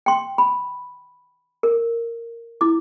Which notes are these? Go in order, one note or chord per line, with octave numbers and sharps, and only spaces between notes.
G5 C6
B5
A#4
E4 D6